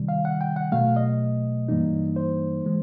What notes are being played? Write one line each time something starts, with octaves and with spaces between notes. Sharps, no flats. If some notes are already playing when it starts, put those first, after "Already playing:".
Already playing: C3 D#3 G3
F5
F#5
G5
F#5
B2 F#3 A3 F5
D#5
G2 E3 G3 A#3 D#4
C5
E3 G#3